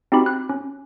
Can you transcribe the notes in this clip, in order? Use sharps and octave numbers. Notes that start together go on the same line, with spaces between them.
C4 D#4 F#4 G4 B5
F#6
C#4